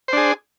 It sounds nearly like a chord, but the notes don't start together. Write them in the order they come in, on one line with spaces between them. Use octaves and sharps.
C5 D4 G#4